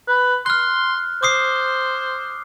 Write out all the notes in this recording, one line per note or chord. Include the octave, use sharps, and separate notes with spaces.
B4
C6 F6 F#6
C5 D6 D#6 C7